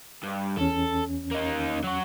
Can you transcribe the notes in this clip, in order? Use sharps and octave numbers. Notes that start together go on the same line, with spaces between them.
G2
E2 C#4 A4
A#3 D#4
F#3 F#4